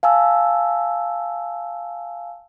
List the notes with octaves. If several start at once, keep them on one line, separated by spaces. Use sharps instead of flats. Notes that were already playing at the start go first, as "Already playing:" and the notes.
F5 G#5 A5 E6